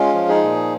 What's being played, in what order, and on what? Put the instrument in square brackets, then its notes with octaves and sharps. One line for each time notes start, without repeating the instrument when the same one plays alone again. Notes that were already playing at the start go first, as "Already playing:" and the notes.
Already playing: [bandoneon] G#3 C#4 F4
F3
D#4 G#4
A#2